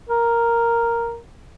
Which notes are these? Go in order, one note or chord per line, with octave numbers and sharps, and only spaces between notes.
A#4